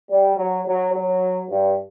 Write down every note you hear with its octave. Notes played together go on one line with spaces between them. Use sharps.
G3
F#3
F#3
F#3
G2